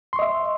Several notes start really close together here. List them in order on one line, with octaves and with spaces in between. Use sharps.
C6 C#6 D#5 E5